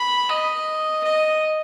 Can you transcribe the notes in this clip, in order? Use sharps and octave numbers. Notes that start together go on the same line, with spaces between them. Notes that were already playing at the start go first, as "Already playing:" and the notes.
Already playing: B5
D#5
D#5